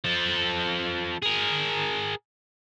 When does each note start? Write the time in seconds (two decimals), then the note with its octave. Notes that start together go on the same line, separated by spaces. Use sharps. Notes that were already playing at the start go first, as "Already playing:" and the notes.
0.05 F3 A4
1.22 G#4 A#4